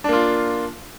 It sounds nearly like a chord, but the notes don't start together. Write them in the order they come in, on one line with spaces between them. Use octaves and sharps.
D4 A#3 F4